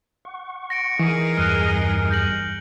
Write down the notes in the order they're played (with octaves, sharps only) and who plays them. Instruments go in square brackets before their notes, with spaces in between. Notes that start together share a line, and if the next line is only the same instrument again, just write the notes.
[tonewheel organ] F#5 C#6
[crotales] A#6 C#7 D7
[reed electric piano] E3 [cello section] D#4 G#4 A#4
[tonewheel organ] E2 G2 G3 [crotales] F6 F#6
[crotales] G6 A#6 F#7